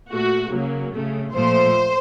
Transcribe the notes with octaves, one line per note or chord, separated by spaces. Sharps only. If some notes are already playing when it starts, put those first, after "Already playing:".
A#2 A3 F#4
C#3 F#3 A#3
C#3 A3
A#2 F3 A3 C5